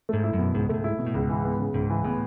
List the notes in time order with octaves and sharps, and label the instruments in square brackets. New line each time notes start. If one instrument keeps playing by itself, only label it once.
[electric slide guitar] G#2 [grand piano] A3
[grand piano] E4
[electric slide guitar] F#2
[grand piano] B2
[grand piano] C#2 [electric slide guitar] G#2
[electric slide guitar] F#2 [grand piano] A3
[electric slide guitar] G#2
[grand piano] E4
B2
[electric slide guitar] A2
[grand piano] C#2 [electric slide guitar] G#2
[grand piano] E3
B3
C#3
[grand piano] C#2 [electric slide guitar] G#2
[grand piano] E3
[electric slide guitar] A2 [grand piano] B3